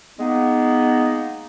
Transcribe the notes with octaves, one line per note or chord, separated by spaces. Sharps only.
G#3 A#3 B3 D#4